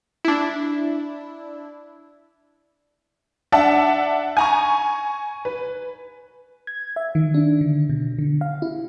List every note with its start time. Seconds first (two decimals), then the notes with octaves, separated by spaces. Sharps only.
0.25 D4 E4
3.52 D4 E5 F#5 A5
4.37 G#5 A#5 C#6
5.45 B4
6.67 G#6
6.96 E5
7.15 D#3
7.34 D4
7.61 D3
7.90 B2
8.19 D3
8.41 F5
8.62 E4